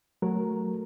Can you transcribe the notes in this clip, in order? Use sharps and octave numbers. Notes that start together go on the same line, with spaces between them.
F#3 A3 A#4